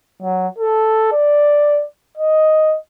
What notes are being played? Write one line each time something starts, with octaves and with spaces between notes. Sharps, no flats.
F#3
A4
D5
D#5